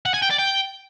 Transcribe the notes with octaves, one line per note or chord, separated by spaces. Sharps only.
F#5
G#5
G5
D5
G5